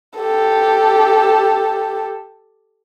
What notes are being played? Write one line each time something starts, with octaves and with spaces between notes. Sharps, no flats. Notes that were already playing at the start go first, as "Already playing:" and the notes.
G4 A4